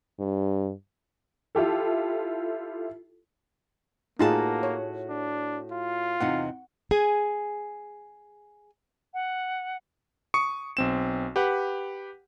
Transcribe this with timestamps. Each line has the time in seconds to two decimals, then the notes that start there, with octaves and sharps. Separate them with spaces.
0.19 G2
1.55 E4 F4 G4 A4
4.19 A2 A#3 D#4 F4 F#4 G#4 A5
4.63 C#5
5.10 D4
5.72 F4
6.21 E2 C3 D#4 F#5
6.91 G#4 G#5
9.14 F#5
10.34 C#6 D#6 C#7
10.77 B1 C4 E7
11.36 G4 B4 F#5